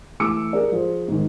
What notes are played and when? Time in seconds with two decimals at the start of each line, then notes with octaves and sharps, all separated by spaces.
0.20 E3 A3 D6 E6 C#7
0.53 G#4 A#4 D5
0.72 F3 G#4 C5
1.08 G#2 D#3